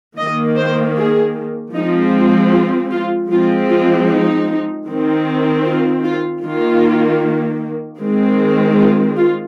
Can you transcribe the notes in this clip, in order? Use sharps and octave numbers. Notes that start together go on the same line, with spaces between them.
D#3 A#3 D#5
C5
G#4
F3 G#3 C4 D#4
F4
F4
F3 G#3 C4 F4
F4
D#4
D#3 C4
F4
F4
D#3 A#3 F4
D#3 G#3 C4
F4
F4